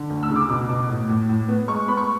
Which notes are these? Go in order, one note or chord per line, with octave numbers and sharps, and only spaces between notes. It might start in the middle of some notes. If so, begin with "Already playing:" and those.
Already playing: D3
D2
E6
C#3
D6
B2 D6
B2
A2
A2
A2
B3
G#3 C#6
B3 B5
C#6